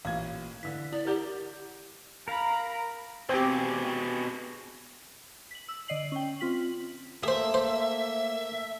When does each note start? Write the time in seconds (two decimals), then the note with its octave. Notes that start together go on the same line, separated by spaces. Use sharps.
0.05 A1 A#2 F5 G#6
0.63 D3 E3 B6
0.93 E4 D5
1.07 G4 A#4 F#5 G6
2.28 A#4 F5 A#5 B5
3.29 B2 C4 G4 G#4 C5
5.51 B6 F#7
5.68 E6
5.88 D3 D5 D#5 C7 F#7
6.12 C#4 G5
6.40 C4 F4 B6 F#7
7.23 A3 A#3 G#4 C5 E5
7.54 C5